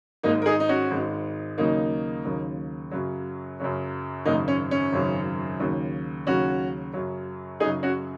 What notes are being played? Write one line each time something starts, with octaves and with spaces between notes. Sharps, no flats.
G#1 G#2 G#3 A#3 D#4
A#4
D#4 G#4
D#4
C#4 F#4
G#1 G#2 G#3
D#2 C#3 F#3 A#3 D#4
D#2 C#3 F#3
F#2 C#3 F#3
F#2 C#3 F#3
G#1 F#2 C#3 F#3 A#3 D#4
C#4
C#4
G#1 F#2 C#3 F#3
D#2 C#3 F#3
D#2 C#3 F#3 C#4 F#4
F#2 C#3 F#3
F#2 C#3 F#3 D#4 G#4
C#4 F#4